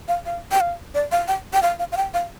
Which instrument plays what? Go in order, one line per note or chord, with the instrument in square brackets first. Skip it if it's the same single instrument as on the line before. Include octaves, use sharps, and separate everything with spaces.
[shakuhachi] F5
F5
G5
F5
D5
F5
G5
G5
F5
F5
F5
G5
F5